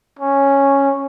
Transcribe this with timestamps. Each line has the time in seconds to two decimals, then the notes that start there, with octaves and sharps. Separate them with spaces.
0.19 C#4